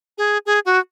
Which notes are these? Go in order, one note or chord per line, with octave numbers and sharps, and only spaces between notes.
G#4
G#4
F#4